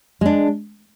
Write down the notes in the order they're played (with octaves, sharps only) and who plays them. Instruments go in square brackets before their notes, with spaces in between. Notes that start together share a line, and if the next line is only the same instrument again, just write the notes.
[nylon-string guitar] G#3 D4